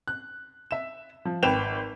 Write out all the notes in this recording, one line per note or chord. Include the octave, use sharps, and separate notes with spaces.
F#6
E5 E7
F3
G#1 B4 G5 E7 F7